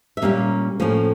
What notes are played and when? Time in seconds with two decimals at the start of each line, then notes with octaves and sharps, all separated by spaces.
0.17 E5
0.22 A#2 G3 A#3 C#4 F5
0.80 A2 F3 A#3 C#4